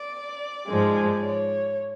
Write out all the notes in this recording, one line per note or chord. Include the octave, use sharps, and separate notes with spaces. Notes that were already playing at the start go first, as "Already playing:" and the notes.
Already playing: D5
G#2 F3 G#3
C#5